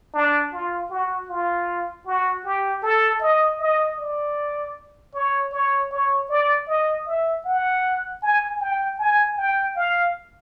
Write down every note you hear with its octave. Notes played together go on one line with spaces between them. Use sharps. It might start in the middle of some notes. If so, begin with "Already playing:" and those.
D4
F4
F#4
F4
F#4
G4
A4
D#5
D#5
D5
C#5
C#5
C#5
D5
D#5
E5
F#5
G#5
G5
G#5
G5
F5